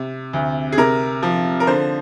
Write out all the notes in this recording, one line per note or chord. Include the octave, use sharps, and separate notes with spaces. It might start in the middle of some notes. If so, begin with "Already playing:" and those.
Already playing: C3
D2
G#4
C3 A#4
F3
A#4
D3 C5